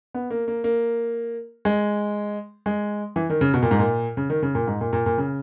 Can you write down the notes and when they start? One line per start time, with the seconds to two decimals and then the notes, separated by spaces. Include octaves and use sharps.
0.14 B3
0.30 A#3
0.48 A#3
0.64 A#3
1.65 G#3
2.66 G#3
3.16 E3
3.30 D#3
3.41 C#3
3.54 B2
3.62 A#2
3.71 G#2
3.79 A#2
4.17 C#3
4.30 D#3
4.42 C#3
4.55 A#2
4.67 G#2
4.81 A#2
4.93 A#2
5.06 A#2
5.18 C#3